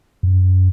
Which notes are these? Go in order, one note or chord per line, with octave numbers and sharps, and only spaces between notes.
F#2